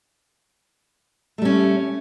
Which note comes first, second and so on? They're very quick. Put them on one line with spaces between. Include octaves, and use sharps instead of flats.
A3 G3 C#4